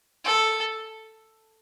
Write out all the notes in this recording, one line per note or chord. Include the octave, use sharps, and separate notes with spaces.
A4